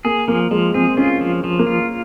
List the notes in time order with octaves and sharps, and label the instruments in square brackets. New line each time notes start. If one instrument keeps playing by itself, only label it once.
[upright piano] A#3 [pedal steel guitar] G#4
[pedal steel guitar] F3 [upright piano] A#3
[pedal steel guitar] F3 [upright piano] G#3
[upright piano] C4 [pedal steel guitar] G#4
[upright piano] C#4 [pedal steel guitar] F4
[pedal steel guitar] F3
F3
[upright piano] A#3
[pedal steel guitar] F4